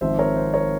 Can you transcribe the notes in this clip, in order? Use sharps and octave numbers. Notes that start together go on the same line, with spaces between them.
G#1 G#2 F3 C4 C5 E5
A#4 C#5
C5
A#4 C#5